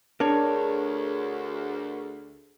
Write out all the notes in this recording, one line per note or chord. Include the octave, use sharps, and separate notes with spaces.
D2 D4 G#4 A#4 C#5